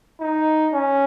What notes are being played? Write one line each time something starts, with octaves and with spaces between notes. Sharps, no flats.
D#4
C#4